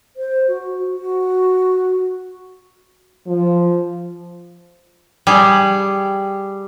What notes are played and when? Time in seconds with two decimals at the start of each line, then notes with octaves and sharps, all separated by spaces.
0.17 C5
0.48 F#4
0.95 F#4
3.27 F3
5.27 G3 G#4